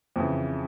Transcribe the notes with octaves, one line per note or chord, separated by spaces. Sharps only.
F2 C#3 E3